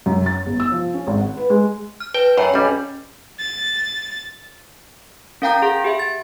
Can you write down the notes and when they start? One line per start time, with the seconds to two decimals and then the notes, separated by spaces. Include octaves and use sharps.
0.06 F#2
0.26 A6
0.46 G1
0.60 E6
0.72 F3
0.94 C#4
1.07 G#1
1.20 F#5
1.37 B4
1.50 G#3
2.00 F6
2.14 B4 G5
2.38 F#2 C#5 G5 B5
2.54 B1 G3 C#4
3.40 A6
5.42 C#4 A#4 F5 G5 A#5 G6
5.62 G#4 F#5
5.84 G4 G#4 E5
5.99 A6